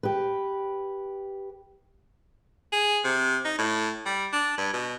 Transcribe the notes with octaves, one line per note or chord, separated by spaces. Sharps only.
G4 B4
G#4
C3
D#4
A2
G3
D4
G2
B2